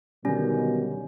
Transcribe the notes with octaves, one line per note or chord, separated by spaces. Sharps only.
B2 D3 D#3 F#3 G3 C#4